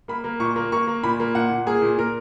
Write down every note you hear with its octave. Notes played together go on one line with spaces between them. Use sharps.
A#3 B5
A#3
A#2 C#6
A#3
A#3 C#6
A#3
A#2 B5
A#3
A#2 F#5
A#2
A#3 G#4
A#2
A#2 A#4